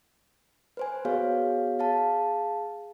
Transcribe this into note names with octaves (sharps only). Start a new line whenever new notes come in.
B4 C5 G#5
B3 F#4 G#4 C#5 F5
G#4 F5 A5